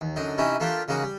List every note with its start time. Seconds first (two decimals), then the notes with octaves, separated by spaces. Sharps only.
0.01 D#2
0.16 F#2 D3 D#4
0.38 C3 C#4 D#4 E4
0.60 A3 A#3 D4 F4 G4
0.88 C#3 G#3 A#3 D#4 F#4
1.03 G3